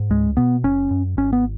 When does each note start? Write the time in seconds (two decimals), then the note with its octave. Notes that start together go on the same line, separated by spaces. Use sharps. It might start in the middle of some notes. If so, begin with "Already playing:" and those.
Already playing: G#2
0.10 C#2 G#3
0.37 B2 B3
0.63 F#1 C#4
0.91 F#2
1.17 G#1 C#4
1.33 B3